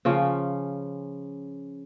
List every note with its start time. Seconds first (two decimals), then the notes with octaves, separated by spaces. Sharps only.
0.05 C#3 F3 C#4 G5